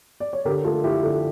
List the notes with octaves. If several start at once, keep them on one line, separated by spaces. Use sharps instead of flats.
D5
C#5
D3 G4 A#4
A3 F4 A4
A3 E4 G4
D3 F4 A4